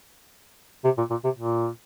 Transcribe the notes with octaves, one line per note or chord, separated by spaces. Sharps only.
C3
A#2
A#2
C3
A#2